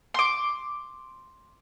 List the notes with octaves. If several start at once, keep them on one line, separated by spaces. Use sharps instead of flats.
C6 D6